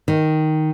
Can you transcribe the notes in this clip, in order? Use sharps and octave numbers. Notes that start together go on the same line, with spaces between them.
D#3